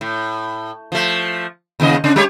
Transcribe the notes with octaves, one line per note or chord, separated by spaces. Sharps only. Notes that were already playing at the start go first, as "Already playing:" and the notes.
A2
F3 A3
D#2 C#3 D#5
C#3 C#4 D4
G3 G4 C#5